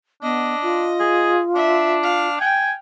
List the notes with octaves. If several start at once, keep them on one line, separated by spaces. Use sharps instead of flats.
B3 D4 D#5
F4
G#4
D4 E5
F5
G5 G#5